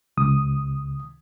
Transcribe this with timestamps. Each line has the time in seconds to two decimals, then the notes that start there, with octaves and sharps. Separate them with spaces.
0.17 C#2 D#6